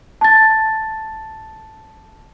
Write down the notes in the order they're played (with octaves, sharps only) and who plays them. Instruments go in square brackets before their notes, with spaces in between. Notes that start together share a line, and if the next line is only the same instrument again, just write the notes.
[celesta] A5 A6